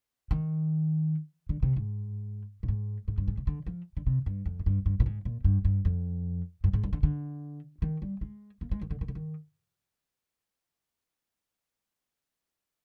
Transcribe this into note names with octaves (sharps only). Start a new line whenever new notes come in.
D#3
D3
C3
G#2
A#2
G#2
G#2
G2
G#2
C3
D3
F3
D3
C3
G2
F2
G#2
G2
G2
A#2
G#2
A#2
G2
G2
F2
G2
G#2
G2
D3
D3
D#3
G3
G#3
A#3
G#3
D#3
D3
D#3
D3
D#3